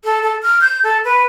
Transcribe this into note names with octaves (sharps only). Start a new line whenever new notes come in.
A4
A4
F6
G6
A4
B4